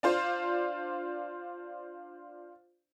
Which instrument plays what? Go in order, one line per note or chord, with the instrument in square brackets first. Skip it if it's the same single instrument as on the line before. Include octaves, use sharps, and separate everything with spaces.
[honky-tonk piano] D4 F4 C5